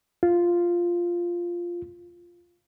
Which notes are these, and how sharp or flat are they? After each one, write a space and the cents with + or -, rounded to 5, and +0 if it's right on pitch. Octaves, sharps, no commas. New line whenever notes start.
F4 -5